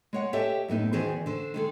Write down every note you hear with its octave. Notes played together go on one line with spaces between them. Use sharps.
G#3 C#5 F#5
G4 A4 C#5 D#5 E5 G5
F#2 A2 B3 D#4
E2 D#3 E3 F#4 G#4 C5
D3 C5
D#3 G#3 A4